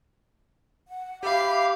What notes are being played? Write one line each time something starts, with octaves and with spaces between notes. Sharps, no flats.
F#5
G4 E5 F5 B5 D6